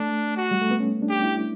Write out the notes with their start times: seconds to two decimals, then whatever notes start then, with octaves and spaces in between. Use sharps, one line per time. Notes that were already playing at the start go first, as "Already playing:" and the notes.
Already playing: A3 D4
0.37 F#4
0.51 G3
0.62 A3
0.71 B3
0.80 C#4
1.02 D4
1.09 G4
1.24 E4